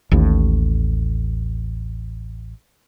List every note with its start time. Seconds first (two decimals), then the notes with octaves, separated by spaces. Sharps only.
0.11 A1 D#2 A2